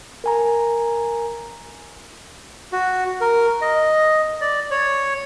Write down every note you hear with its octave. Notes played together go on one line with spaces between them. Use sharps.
A#4 G#5 A#5
F#4
A#4
D#5
D5
C#5